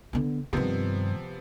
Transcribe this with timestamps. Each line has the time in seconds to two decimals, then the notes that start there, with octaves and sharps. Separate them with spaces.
0.13 D3 B3
0.53 G2 C3 D#3 F3 B3